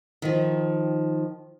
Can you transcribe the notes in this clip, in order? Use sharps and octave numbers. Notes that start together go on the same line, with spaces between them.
D#3 F3